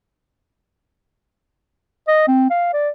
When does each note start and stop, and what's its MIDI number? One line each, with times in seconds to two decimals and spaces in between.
2.08 2.23 75
2.28 2.49 60
2.50 2.70 77
2.73 2.90 74